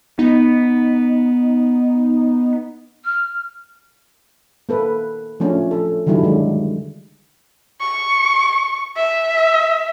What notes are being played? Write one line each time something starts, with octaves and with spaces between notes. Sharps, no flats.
B3 D#4
F6
A#3 A4 B4
F3 A3 C#4 D4
A4
D3 D#3 F#3 G3 E4 A4
D3 G#3
C#6
E5